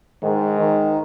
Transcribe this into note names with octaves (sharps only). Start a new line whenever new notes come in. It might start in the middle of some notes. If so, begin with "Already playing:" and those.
G#2 D#3
D#3